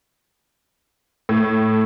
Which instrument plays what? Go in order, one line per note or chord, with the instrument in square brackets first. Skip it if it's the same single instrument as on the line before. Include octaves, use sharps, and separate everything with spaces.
[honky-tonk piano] A2